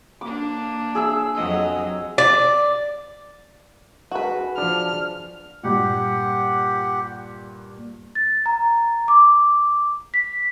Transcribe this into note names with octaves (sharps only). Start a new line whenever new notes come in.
A#3 D4 D6
G#4 E5 E6
F2 F#3 D#5
D5
F#4 G#4 B4
F3 D4 F6
G2 A#2 G4 F#5
A6
A#5
D6
B6